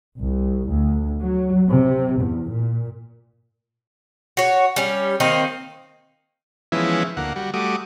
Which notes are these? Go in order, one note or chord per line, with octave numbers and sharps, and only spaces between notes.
C2
D2
F#3
C3
E2
A#2
F#4 C#5
G3 C#4
D#3 A#3 C4 D#4
E3 F3 G#3 B3 C#4 E4
D2 A#3 F#5
G3 F#4
G3 A3 F#4 D6 D#6